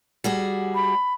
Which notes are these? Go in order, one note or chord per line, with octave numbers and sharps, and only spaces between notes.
G3 F#4 G#4
B5